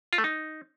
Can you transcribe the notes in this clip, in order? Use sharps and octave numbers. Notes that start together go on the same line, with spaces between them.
F4
A3
D#4